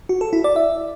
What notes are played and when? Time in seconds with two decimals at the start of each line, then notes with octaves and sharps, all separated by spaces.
0.09 F#4
0.21 A4
0.33 E4
0.44 D5
0.56 E5